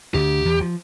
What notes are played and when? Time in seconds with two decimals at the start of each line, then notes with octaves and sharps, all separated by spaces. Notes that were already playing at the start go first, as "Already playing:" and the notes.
0.14 D2 D3 G4
0.45 E2 E3
0.61 F3